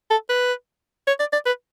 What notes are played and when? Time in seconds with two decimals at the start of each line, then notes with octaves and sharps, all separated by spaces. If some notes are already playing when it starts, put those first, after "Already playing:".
0.11 A4
0.29 B4
1.07 C#5
1.20 D5
1.33 D5
1.46 B4